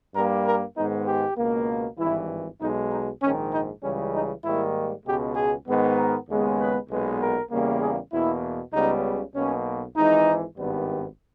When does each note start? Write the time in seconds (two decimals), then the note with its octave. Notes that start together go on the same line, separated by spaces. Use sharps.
0.15 G2 G3 A#3 A#4
0.46 A#4
0.77 G#2 D#3 G#3 B3 D#4
1.08 G4
1.37 C#2 B2 A#3
1.99 G#1 G2 E3 E4
2.60 B1 B2 G#3 D#4
2.91 D#4
3.22 A#1 G#2 D#3 C#4
3.52 D#4
3.83 C#2 C#3 E3 G3 C#4
4.14 D#4
4.44 G#2 D#3 G3 A#3 E4
5.06 C#2 B2 G#3 B3 G4
5.36 G#4
5.67 G#2 D#3 G#3 B3
5.98 A#4
6.28 D#2 C#3 G#3 B3
6.59 B4
6.89 B1 A#2 G#3 B3
7.21 A#4
7.51 E2 C#3 G3 A#3
7.81 G#4
8.12 E2 B2 A#3 E4
8.73 C#2 C#3 G3 B3 D#4
9.35 B1 B2 A#3 C#4
9.96 G#1 G#2 E3 D#4
10.57 G#1 G2 D#3 G3 B3